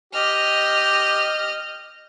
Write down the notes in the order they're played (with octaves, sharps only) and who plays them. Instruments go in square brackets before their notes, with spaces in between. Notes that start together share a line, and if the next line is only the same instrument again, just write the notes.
[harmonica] G4 [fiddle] D#5 F6